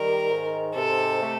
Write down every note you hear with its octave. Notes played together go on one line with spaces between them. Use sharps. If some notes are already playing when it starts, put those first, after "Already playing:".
Already playing: D#3 G3 A#4
G#2
C3 A4
A3